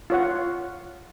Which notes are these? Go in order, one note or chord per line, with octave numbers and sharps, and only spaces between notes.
F4 C#5 F#5